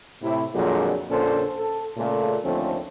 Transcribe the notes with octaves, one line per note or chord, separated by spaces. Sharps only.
A2 C3 E4
F2 A#2 D3 F3 F#3 G#3
A#1 A#2 D3 C#4 A4 C5
A4
A#2 C#3 A3
D#2 D3 F3 A3 C4 C#4